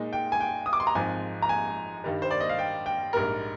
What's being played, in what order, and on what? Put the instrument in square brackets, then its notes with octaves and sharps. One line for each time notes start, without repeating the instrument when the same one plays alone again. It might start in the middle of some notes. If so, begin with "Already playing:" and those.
Already playing: [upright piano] A#2 G#3 D#4
G5
G#5
G5
D#6
D6
C6
A#5
G#1 G#2 F3 C4 G#5
A#5
G#5
G2 D#3 G3
C5
D5
D#5
F5
G5
G5
A#1 G#2 G3 A#3 A#4